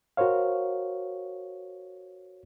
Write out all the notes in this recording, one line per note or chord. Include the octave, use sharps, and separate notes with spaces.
F#4 A#4 C5 C#5 F5